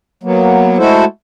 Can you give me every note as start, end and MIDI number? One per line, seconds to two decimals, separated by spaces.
0.23 0.78 54
0.23 0.78 58
0.23 0.78 59
0.78 1.05 56
0.78 1.05 57
0.78 1.05 64
0.78 1.05 66
0.78 1.05 69
0.78 1.05 72